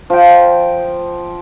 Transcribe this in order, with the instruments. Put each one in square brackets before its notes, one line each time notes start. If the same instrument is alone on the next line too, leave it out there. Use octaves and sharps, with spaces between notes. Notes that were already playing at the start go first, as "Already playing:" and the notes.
[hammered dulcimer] F3 G5